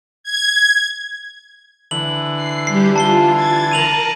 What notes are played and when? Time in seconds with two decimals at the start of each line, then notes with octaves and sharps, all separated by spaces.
0.24 G#6
1.91 D3 E3 F#7
2.36 C7
2.67 G3 G4 C7
2.96 F4 A5 C7 G7
3.34 G#6 A6
3.71 A#4 A5 A#5 D#7 F7 F#7